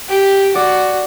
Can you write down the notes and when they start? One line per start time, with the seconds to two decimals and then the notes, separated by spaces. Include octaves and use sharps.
0.09 G4
0.54 F#4 D5